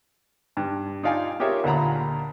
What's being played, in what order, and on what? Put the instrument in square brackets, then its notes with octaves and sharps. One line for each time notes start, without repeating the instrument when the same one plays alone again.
[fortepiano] G2
D#4 F4 D5 F5 G5 G#5
F4 G4 G#4 A#4 C#5 E5
D2 A#2 F4 F#5 A#5 B5